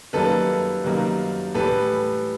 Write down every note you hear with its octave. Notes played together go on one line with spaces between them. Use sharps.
F#2 D#3 G3 A#3 A4 B4
F#2 D#3 G3 A#3
A2 E3 G3 A4 B4